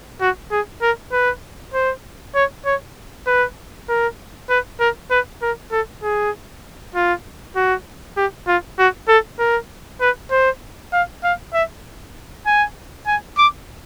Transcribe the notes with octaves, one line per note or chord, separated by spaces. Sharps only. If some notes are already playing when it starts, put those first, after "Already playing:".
F#4
G#4
A#4
B4
C5
C#5
C#5
B4
A#4
B4
A#4
B4
A#4
A4
G#4
F4
F#4
G4
F4
F#4
A4
A#4
B4
C5
F5
F5
E5
G#5
G#5
D6